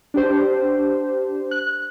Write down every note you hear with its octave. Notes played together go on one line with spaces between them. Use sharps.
D4 G4 C5
F#6